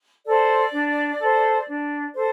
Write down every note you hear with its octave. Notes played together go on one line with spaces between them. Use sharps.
A4 C5 D5
D4
A4 C5
D4
A4 C5